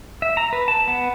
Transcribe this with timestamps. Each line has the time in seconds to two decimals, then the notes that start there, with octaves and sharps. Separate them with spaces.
0.22 E5
0.37 A#5
0.53 B4
0.68 A5
0.88 B3